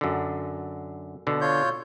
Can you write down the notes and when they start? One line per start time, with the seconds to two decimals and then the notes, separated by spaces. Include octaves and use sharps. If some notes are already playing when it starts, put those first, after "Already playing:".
0.01 F#2 D3
1.27 B2 D3
1.41 F4 C#5 G6